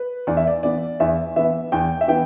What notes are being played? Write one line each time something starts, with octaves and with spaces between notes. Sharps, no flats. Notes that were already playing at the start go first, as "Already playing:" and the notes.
Already playing: B4
E2 D5
E5
D5
E3 B3 D5
E2 E5
E3 B3 E5
E2 G5
E5
E3 B3 G5